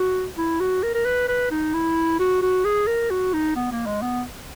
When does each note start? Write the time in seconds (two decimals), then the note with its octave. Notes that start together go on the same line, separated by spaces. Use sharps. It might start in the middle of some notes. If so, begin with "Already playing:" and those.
Already playing: F#4
0.38 E4
0.60 F#4
0.83 A#4
0.95 A#4
1.05 B4
1.28 B4
1.51 D#4
1.74 E4
2.20 F#4
2.42 F#4
2.65 G#4
2.87 A#4
3.10 F#4
3.33 D#4
3.56 B3
3.72 A#3
3.86 G#3
4.02 B3